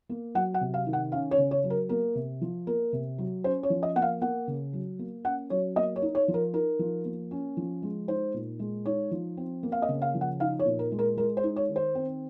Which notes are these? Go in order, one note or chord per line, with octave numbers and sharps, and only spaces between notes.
A#3
F#3 F#5
F#5
C3
F5
D#3
F#5
C#4 F5
C#5
C#3
C#5
F#3
A#4
A#3 A#4
C3
F3
A#3 A#4
C3
F#3
C#4 C5
C#5
F3
D#5
A#3 F#5
F5
A#3 F#5
C#3
F#3
A#3
C#4 F#5
F#3 C#5
A#3 D#5
C#5
D#4
C#5
F3
A#4
D#4 A#4
F3
A#3
C#4
F3
G#3
D#4 C5
A#2
G#3
D#4 C#5
F3
C4
A#3
F5
D#5
C#3
F5
F3
F#5
D#4 F5
C#5
A#2
A#4
G#3
A#4
G#3 A#4
C5
D#4
C#5
D#3
C5
C4